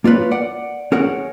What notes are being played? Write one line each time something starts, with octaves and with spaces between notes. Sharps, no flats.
A#3 F4 A#4 B4 C#5
D5 F#5
C#4 G#4 A#4 C#5 F#5